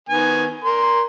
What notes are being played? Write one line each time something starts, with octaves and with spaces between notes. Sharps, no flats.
D#3 B3 G#5
A#4 C6